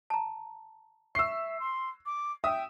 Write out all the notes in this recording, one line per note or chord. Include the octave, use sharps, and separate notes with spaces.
A5 A#5
E5 C#6 E6 C7
C6
D6
E5 G5 D#6